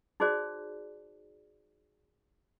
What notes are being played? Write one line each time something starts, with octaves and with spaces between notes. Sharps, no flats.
D#4 F#4 G#4 C5 D5